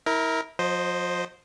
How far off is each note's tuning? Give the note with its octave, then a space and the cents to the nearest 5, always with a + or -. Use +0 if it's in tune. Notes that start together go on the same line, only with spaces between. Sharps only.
E4 -30 A#4 +0
F3 +40 C5 +0 D#5 -10